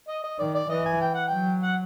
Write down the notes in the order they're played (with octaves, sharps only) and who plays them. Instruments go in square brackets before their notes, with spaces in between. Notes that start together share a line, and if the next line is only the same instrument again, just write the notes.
[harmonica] D#5
D#5
[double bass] D#3 [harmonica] D5
[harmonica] D5
[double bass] E3 [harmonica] D#5
[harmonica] G#5
G5
F#5
G5
[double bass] F#3
[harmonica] F#5